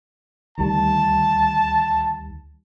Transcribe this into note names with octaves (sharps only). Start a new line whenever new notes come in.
D2 D#3 G3 A5